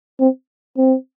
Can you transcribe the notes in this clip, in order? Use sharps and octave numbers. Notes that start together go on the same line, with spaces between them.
C4
C4